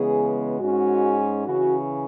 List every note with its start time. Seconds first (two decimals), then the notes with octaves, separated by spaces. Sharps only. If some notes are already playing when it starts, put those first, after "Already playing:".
Already playing: C#3 E3 G#3 B3 G#4
0.59 G#2 G#3 C#4 F#4
1.45 C#3 E3 C#4 F#4